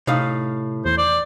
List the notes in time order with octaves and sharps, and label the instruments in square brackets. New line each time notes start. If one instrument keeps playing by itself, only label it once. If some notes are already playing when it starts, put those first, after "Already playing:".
[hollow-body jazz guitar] A2 D#4 F5 [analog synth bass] C3
[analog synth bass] E2 [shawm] C5
[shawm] D5